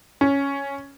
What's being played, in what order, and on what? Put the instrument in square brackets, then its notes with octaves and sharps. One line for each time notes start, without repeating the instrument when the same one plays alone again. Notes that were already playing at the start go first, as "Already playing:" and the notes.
[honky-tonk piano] C#4